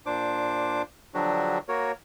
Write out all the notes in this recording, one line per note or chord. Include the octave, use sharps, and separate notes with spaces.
A#2 D4 C5 D6
D3 F3 F#3 D4 F#4 G4
A#3 F#4 A#4 C#5